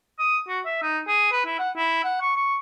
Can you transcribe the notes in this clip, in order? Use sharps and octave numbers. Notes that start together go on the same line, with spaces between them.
D#6
F#4
E5
D#4
G#4
B4
E4
F#5
E4
F#5
C#6
C#6